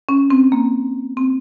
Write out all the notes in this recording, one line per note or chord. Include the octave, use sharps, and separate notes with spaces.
C#4
C4
A#3
C4